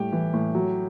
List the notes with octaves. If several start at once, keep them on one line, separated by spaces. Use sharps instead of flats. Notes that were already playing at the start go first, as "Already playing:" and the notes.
Already playing: A2 G3 G4
E3
A2
F#3